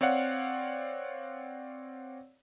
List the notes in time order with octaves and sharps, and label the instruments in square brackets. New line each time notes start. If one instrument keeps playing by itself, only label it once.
[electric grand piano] C4 C#5 D5 F5 F#5